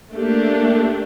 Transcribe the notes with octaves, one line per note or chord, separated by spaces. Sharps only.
A3 A#3 D4 G4